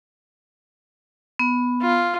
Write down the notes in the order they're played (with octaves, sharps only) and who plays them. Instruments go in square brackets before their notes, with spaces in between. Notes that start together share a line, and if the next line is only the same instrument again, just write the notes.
[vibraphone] B3
[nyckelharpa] F4